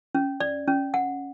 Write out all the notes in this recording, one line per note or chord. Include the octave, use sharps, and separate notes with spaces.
C#4
D5
C#4
F#5